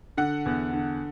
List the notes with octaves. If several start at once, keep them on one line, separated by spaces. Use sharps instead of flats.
D3 F#5
E2
D3